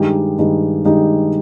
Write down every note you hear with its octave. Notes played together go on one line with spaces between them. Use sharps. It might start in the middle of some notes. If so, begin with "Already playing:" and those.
Already playing: G2 D#3 G#3 D#4 G4
G2 D#3 G#3 D#4 G4
G2 D#3 G#3 D#4 G4